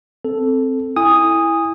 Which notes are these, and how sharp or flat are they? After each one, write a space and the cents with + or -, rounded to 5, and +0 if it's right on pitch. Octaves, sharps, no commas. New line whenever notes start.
C4 +0 A4 +0
E4 +0 G#5 -30 D#6 +0